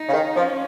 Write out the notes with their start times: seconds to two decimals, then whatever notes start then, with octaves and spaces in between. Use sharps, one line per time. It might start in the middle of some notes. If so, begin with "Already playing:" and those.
Already playing: D#4
0.09 C#3
0.13 D#3
0.36 F3 C#4